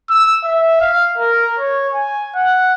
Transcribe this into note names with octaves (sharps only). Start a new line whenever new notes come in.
E6
E5
F5
A#4
C#5
G#5
F#5